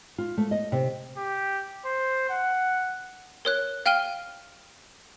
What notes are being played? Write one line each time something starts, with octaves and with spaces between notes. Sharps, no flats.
F4
A3
D#5
C3
G4
C5
F#5
A#4 C#5 F#6
F5 G5 F6 D#7 G7